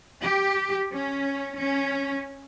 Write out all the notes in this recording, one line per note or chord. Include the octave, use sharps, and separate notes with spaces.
G4
C#4
C#4